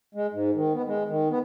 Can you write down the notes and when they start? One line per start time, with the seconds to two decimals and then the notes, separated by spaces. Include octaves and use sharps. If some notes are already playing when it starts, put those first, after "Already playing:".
0.15 G#3
0.33 G#2
0.55 D#3
0.74 B3
0.87 G#3
1.08 D#3
1.30 B3